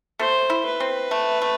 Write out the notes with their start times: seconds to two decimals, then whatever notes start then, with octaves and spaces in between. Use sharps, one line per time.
0.19 A3 C5
0.50 E4
0.66 B4
0.80 C4
1.11 A3
1.42 A3